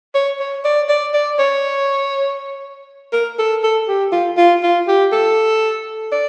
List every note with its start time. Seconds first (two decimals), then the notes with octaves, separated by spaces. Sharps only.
0.15 C#5
0.39 C#5
0.65 D5
0.89 D5
1.14 D5
1.39 C#5
3.13 A#4
3.39 A4
3.63 A4
3.88 G4
4.12 F4
4.37 F4
4.63 F4
4.88 G4
5.12 A4
6.12 D5